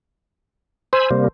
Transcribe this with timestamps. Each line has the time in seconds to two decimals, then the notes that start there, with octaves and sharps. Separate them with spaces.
0.93 C5 G#5 B5 E6
1.11 C3 G3 A#3